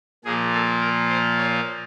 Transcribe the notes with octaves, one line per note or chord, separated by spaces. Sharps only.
A#2 F3 A#3 G#4
A4
A#4
C5
C#5